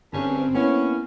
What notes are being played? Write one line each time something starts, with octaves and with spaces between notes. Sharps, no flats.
G1 G2 C4 C#4
A#3 B3 C#4 E4